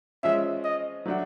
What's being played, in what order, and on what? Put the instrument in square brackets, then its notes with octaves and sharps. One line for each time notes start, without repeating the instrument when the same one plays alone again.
[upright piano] F3 G#3 C#4 F4 [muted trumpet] E5
[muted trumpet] D#5
[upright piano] F#3 A3 D4 F#4